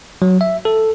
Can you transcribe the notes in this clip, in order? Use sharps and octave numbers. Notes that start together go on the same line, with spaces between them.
F#3
E5
A4